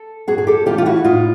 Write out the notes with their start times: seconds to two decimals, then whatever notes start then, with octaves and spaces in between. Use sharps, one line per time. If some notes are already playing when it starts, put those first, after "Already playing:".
Already playing: A4
0.28 G2 F#4 G#4
0.38 G#4
0.47 G4 A4
0.66 E3 A3 C#4 F4 G4
0.78 F4
0.86 E4 F#4
1.04 A2 D#4 F4